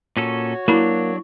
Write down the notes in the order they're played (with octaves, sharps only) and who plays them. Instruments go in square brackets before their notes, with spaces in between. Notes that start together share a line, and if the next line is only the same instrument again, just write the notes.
[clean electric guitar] A#2 C#4 A4 [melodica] F#4 C#5
[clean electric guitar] F#3 D4 [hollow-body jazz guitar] A#3 [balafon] E4 B5